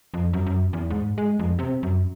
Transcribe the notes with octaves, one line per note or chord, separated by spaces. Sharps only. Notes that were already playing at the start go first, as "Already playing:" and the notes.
F2
F#2
F#2
E2
G#2
G#3
F2
C3
F#2